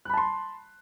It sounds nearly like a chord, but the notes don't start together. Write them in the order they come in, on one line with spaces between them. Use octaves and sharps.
F#6 B5 A5 C6